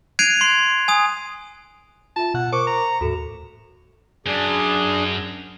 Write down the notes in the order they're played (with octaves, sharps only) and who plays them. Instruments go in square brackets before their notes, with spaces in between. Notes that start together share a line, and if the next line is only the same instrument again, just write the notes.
[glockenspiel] F#6 G#6 C7 D7 D#7 F7
C6 C7
G#5 D#6
[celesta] F4 E5 [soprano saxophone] A5
[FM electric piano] B2 [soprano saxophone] F#5
[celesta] A#4 [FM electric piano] C5 C#6 C#7 [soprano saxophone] D6
[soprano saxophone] A#5
[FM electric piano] D#2 A2 [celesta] F#4 A4 E7
[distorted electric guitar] F#2 [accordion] D4 G#4